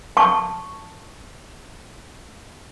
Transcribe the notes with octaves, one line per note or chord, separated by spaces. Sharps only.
A5 C#6